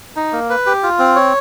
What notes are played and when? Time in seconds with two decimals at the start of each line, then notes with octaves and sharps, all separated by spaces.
0.16 D#4
0.33 A#3
0.50 B4
0.66 G4
0.83 F4
0.99 C4
1.16 C#5